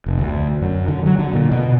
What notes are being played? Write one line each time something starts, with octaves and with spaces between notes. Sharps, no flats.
F1
D2
F#2
D3
F#3
D3
A#2
B2